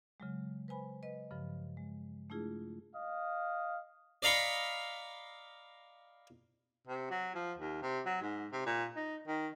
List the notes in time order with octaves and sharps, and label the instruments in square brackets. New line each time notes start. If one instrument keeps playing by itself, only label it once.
[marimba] C#3 F#3 G#3
B4 C5 G#5 B5
B4 D#5
G2 C#3 F3
G#3
A3 D4 E4 F4 G#4
[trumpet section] D#5 F5
[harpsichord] D5 D#5 F5 A#5 B5 C#6
[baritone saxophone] C3
F#3
F3
D#2
C3
F#3
G#2
C3
A#2
D#4
D#3